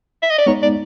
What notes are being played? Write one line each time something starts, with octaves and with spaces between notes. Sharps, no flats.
E5
D#5
D5
G#3 B3 D#4 C#5
D5